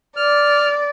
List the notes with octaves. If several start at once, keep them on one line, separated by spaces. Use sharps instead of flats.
D5 F6